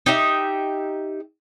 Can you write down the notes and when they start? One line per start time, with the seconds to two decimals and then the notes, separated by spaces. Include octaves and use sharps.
0.06 D#4 G4 E5